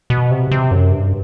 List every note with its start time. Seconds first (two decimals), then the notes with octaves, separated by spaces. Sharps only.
0.10 B2
0.31 C3
0.51 C3
0.71 F#2
0.92 G2